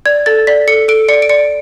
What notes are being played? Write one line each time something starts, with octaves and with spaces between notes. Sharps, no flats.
D5 G#6
A4 A6
D5 B6
A4 C#7
A4 D7
D5 C#7
D7
D5 C#7